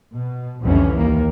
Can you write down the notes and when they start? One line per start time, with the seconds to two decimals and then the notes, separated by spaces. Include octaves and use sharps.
0.14 B2
0.62 C2 F2 D3 E3 C#4
0.95 D#2 D#3 A#3